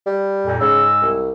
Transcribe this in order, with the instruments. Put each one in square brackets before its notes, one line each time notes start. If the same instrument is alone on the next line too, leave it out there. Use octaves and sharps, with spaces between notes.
[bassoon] G3
[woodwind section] F2 A#2
[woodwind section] G#2 G#3 E6 [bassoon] C#3
[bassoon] C2